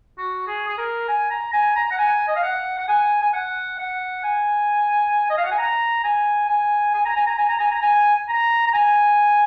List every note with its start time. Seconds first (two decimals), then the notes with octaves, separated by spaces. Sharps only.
0.18 F#4
0.47 G#4
0.67 G#4
0.78 A#4
1.08 G#5
1.30 A#5
1.53 G#5
1.76 A#5
1.91 F#5
1.98 G#5
2.28 D#5
2.36 F5
2.43 F#5
2.78 F#5
2.88 G#5
3.22 G#5
3.33 F#5
3.79 F#5
4.24 G#5
5.30 D#5
5.38 F5
5.44 F#5
5.52 G#5
5.59 A#5
6.04 G#5
6.49 G#5
6.94 G#5
7.05 A#5
7.16 G#5
7.27 A#5
7.38 G#5
7.49 A#5
7.60 G#5
7.71 A#5
7.82 G#5
8.29 A#5
8.67 A#5
8.74 G#5